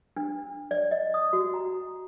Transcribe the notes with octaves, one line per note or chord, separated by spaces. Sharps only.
D4
D5
D#5
D#6
F#4
A#5